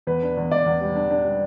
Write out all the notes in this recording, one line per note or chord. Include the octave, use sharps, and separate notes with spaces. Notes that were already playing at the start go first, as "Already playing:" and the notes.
E2 B4
D4
E2
E2 D5
E2
G3
D4
D4
G3